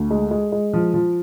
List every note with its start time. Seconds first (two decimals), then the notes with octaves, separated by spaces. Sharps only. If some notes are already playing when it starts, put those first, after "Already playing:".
Already playing: D2
0.10 G#3
0.31 G#3
0.52 G#3
0.73 F3
0.94 F3